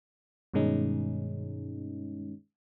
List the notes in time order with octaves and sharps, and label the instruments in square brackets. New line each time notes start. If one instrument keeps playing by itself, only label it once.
[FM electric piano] G2 B2 D#3 G#3 C#4 D#4